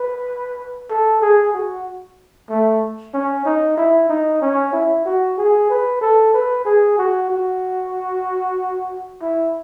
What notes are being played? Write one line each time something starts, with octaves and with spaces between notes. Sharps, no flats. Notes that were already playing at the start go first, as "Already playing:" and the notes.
Already playing: B4
A4
G#4
F#4
A3
C#4
D#4
E4
D#4
C#4
E4
F#4
G#4
B4
A4
B4
G#4
F#4
F#4
E4